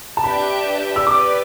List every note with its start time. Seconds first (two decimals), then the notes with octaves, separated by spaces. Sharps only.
0.17 A5
0.24 D4 G4 B4 E5 G5 B5
0.96 E6
1.07 G4 B4 D5 D6